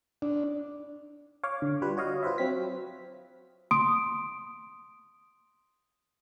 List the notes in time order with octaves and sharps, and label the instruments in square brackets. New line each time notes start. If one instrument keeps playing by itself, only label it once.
[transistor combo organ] D4
[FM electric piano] C#5 F5 D6
D3
G3 F4 B4
F#4 C#5 D#5 F5
F4 B4 C5 E5
F#3 C4 B6
[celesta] C6 D#6 D7